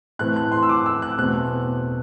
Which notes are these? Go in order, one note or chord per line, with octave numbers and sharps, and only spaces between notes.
A2 E3 A3 C4 F#6
F#6
C6
E6
D6
E6
F#6
E2 B2 A3 C4 F#6